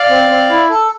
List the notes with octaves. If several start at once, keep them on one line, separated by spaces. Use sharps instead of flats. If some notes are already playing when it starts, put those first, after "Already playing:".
Already playing: D5 F5
C4
C4
E4
A4